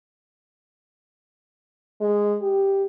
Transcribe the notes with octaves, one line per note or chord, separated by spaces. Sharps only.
G#3
G4